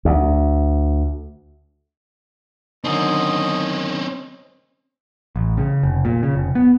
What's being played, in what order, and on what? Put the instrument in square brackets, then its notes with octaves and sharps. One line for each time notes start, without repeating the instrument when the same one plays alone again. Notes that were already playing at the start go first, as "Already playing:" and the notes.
[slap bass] D2
[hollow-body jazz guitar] F#2 D3 D#3 [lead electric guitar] C4 C#4 [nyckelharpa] D#5
[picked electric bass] A1
C#3
F1
A#2
C#3
F1
B3